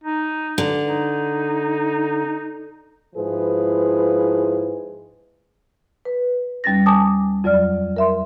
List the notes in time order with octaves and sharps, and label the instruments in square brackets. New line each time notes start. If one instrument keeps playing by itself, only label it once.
[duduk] D#4
[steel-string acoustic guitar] D3
[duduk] D#4
[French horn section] G#2 F3 E4 G#4 B4
[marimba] B4
D#2 G3 C#4 A6 A#6
G#5 A5 D6 D#6
F2 F#3 D5 F6
A#4 E5 C6